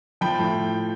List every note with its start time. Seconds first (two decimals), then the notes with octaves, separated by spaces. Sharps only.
0.21 F3 G5 B5
0.39 A2